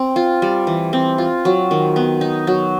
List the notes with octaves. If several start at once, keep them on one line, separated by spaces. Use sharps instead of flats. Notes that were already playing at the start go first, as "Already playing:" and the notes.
Already playing: C4
F4
G3
E3
C4
F4
F#3
D#3
B3
D#4
F#3